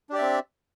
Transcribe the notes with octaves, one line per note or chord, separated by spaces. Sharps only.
C4 D4 G4 D5 E5